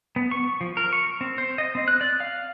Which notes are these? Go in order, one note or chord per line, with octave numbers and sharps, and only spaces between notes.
B3
C#6
F3
A#4
C#6
C4
C5
D#5
C4
F#6
D5
F5